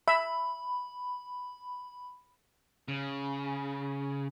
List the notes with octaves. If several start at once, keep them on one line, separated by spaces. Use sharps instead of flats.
E5 B5
C#3